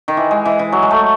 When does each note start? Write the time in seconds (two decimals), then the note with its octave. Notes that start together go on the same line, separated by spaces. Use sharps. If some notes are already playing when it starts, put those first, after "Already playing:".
0.08 D#3
0.17 E3
0.31 G#3
0.45 E3
0.59 E3
0.72 F#3
0.83 G#3
0.91 A3